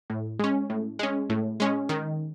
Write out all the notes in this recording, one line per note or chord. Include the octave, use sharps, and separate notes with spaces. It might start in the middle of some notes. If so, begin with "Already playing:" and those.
A2
G#3 C#4
A2
G#3 C#4
A2
G#3 C#4
D#3